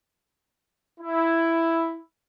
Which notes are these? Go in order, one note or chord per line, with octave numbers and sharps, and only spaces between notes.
E4